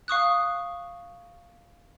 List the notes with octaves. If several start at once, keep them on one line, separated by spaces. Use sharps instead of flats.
F5 C#6 D#6 F#6